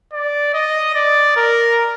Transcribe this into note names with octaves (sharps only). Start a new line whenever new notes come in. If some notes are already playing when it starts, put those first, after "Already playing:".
D5
D#5
D5
A#4